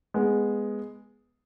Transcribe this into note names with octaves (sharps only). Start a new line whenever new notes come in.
G#3 B3